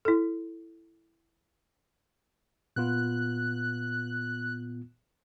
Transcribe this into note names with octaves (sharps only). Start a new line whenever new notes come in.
E4 A4
A#2 B3 F4 F#6